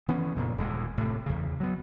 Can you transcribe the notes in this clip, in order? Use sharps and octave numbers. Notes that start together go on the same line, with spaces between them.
E3 B3 C#4
F2 A#2 C#3
D#1 D#2 G#3
A2 C3
E2 C#3
F#3 B3